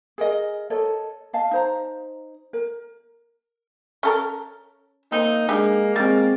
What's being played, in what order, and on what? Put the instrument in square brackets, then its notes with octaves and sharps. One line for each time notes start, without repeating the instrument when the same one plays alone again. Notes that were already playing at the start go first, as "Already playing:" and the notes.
[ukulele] G#4 A#4 D#5
A4 A#4 C#5 D#5
D#5 F5 A5
D#4 C5 A#5
A#4
[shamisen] C#4 A4 A#4
[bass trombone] A#3 [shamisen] C4 [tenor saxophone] D#4
[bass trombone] G#3 [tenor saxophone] A#3 [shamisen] D4 G4
[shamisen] G3 [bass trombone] G#3 [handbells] C4 A6